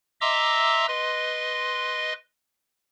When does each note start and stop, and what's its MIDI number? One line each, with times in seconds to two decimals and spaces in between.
0.21 0.86 75
0.21 0.86 76
0.21 0.86 82
0.21 0.86 84
0.21 0.86 86
0.21 0.86 88
0.88 2.13 71
0.88 2.13 75
0.88 2.13 84